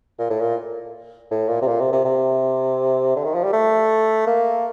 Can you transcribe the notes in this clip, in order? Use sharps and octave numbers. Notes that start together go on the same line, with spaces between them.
A#2
A2
A#2
A2
A#2
C3
A#2
C3
C3
C3
D3
D#3
F3
G3
A3
A#3